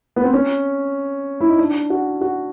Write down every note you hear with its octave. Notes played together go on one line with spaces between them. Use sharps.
B3
C4
C#4
E4
D#4
D4
F#4
F#4